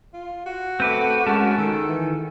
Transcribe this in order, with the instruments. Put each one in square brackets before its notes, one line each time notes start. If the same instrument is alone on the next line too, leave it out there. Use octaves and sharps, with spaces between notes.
[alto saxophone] F4
F#4
[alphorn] A3 [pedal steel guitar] C4 B4 D6
[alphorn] G#3 [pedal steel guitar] C#4 A#4 A5
[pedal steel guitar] D#3 [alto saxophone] A4
[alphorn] E3